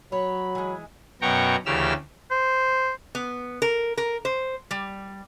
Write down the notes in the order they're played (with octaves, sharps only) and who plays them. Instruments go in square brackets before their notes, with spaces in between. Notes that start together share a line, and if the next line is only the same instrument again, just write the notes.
[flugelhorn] F#3 [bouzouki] C#5 [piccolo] B5
[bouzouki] E3 G#3
[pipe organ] F#2 B2 B3 G5 A#5 C#6
D2 C#3 E3 G4 E6 F6
[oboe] C5
[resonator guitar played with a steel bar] B3
A#4
A#4
C5
G3